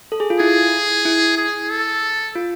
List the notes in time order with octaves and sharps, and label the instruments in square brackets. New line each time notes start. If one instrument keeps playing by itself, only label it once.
[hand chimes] A4
G#4
F4
[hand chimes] E4 [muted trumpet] G#4
[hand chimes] E4
[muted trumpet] G#4
A4
[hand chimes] F4